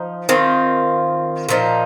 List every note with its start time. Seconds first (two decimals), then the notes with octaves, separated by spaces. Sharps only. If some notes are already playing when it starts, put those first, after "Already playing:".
Already playing: F3 D#4 C5
0.29 D#3 C4 F4
1.49 A#2 F3 D#4